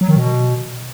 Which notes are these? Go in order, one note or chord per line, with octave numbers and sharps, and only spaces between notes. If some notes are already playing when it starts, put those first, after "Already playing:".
F#3
D#3
B2